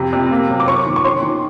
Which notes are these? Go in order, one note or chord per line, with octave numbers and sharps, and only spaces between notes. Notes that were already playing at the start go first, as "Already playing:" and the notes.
Already playing: F2 C3
C3
A#3
F#2
D6
C#4 C#6
D#3
C#6
C#4 C6
D#3